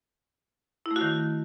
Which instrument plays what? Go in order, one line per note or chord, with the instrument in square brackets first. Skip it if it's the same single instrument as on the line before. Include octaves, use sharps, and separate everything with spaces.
[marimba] E4
A3
F#4
D#3